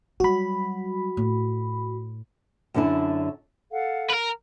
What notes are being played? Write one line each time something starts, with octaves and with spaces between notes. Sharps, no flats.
F#3 G3 F#4 B5
A2
F#2 D3 C#4 D4 E4
A4 F5 F#5
A#4 B4